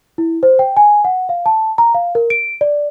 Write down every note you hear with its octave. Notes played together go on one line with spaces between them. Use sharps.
E4
C5
G5
G#5
F#5
F5
A5
A#5
F5
A#4
D7
D5